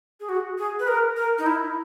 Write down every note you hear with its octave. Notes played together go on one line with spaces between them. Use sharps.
G#4
F#4
G#4
B4
A#4
A#4
D#4
E4